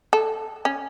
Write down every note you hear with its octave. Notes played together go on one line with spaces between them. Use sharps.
A4
C#4